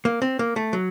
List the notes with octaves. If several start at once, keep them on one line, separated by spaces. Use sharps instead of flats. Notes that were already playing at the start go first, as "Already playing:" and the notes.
A#3
C4
A#3
A3
F#3